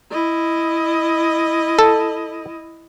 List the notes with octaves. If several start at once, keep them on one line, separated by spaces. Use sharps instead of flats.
E4 D#5
A4